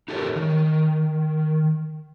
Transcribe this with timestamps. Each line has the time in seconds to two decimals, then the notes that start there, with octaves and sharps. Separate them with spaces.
0.08 D#4 G4 A4 A#4 C#5
0.36 D#3